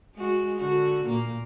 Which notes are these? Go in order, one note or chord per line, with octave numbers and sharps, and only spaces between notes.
G#3 F#4
D3 F#4
A#2 A#3